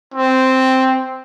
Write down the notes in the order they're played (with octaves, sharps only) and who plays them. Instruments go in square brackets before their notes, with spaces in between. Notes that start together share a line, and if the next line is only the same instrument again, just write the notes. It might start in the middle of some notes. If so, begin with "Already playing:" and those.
[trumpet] C4